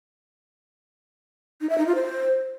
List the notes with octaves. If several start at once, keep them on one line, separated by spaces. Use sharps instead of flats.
D#4
E5
D#4
F4
C5